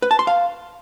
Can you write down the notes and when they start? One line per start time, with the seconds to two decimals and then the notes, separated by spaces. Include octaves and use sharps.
0.02 B4
0.11 A5
0.19 C6
0.27 F5